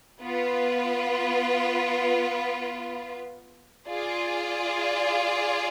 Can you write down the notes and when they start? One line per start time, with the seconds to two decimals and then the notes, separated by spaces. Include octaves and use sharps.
0.21 B3 F4 B4
3.87 F4 G#4 D5